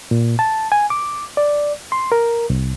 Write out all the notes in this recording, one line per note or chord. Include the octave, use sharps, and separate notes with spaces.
A#2
A5
G#5
D6
D5
C6
A#4
C2